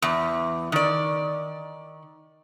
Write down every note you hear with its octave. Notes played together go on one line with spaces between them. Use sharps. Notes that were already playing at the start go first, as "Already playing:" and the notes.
E2
D#3 D5